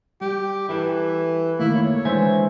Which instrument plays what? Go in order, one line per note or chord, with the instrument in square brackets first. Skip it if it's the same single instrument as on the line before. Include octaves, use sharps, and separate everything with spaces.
[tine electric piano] G3 [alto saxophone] G4
[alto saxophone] E3 [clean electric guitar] E4 G4 A4
[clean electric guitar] D#3 A3 [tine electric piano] A#3 [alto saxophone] E4
[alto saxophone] C#5
[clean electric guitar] D3 G#3 G#5 [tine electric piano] E3 C5 E5